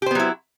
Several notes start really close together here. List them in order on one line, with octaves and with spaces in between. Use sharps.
G4 C5 B3 F#3 E4